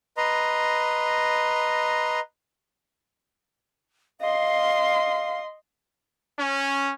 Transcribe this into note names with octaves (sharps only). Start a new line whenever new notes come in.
B4 D#5 A#5 C6
D#5 F5 C6
C#4